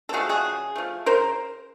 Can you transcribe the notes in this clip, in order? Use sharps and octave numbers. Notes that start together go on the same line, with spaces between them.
A4
F3 A3 F#4 G#4
F#4 G#4
C#3
F3 A3
C#3 A#4 C5